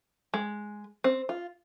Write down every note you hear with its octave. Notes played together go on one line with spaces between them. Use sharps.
G#3
C4
F4